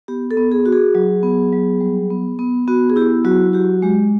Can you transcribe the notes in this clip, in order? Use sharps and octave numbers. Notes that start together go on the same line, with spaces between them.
B3 G4
A4
B3
G#4
F#4
G#4
F#3
B3
F#3
G3
B3
B3
B3 F#4
G#4
E4 G4
F#3 F#4
F#4 G4
G#3 G4